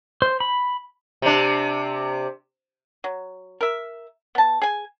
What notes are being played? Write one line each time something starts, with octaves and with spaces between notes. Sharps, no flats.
C5
B5
C3 D4
F#3
A#4 E5
B3 A5
G#4 G#5